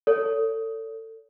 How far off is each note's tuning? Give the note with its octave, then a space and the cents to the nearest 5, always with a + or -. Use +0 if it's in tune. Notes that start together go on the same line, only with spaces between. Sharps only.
A4 +25 C#5 +35